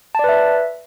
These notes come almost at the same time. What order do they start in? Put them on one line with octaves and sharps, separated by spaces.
A5 D5 B4 E5